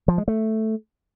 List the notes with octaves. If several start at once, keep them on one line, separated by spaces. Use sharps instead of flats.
F3
G#3
A3